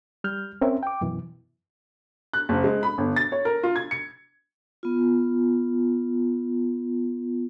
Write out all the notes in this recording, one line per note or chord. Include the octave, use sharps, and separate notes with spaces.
G3 F6 G6
C4 C#4 A#4 E5
G5 D6
F#2 B2 E3
F#6
F#1
G#3
B5
G1
A6
C#5
A#4
F4
G#6
C#7
B3 F4